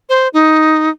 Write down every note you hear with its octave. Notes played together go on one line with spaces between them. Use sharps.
C5
D#4